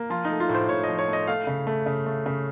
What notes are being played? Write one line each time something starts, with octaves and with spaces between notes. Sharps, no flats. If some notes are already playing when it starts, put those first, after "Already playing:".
Already playing: A#3
F3 F4
D#4
A3
F4
A2
C5
A2 C#5
D#5
F3
C#5
A3 D#5
A3 F5
C#3
A3
C#3
A3
C#3